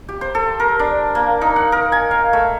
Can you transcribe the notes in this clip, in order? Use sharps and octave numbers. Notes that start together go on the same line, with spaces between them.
G4
C5
A4
A#4
D4
A#3
D#4
F#5
A#4
G#5
F5
A3